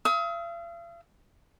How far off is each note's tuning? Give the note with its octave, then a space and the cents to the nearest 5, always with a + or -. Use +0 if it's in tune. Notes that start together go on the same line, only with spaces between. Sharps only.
F5 -45 D#6 +40